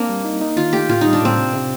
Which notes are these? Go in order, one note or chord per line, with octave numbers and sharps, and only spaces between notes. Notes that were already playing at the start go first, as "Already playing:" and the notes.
Already playing: A#3 C4 D4 A#4
G3
D#4
D#4
D#3 F4
A3 G4
A2 F4
G3 D#4
D4
A2 C4
C3
C3